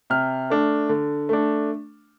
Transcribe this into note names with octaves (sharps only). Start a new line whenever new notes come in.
C3 F6
A3 D4
D3
A3 D4